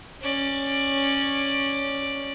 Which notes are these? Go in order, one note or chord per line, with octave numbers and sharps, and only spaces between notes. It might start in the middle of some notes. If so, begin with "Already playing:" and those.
C#4 D5